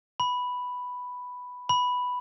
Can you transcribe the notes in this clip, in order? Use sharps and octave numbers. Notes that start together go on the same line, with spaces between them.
B5
B5